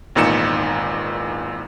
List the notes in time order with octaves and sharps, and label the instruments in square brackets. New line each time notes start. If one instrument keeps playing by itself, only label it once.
[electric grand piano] G#1 E2 A#2 D#4 C#7 E7